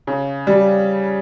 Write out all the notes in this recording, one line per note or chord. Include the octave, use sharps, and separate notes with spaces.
C#3
G3